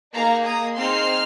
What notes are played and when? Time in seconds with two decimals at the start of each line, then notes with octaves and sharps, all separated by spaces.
0.13 A#3 D#4 G#4 F5 A#5
0.45 A#5 D#6
0.76 C4 D#4 G#4 C6 F6